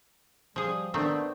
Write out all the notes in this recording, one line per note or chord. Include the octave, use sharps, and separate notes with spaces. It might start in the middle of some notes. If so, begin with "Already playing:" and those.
F3 G3 G#4
D#3 A3 B3 C4 D4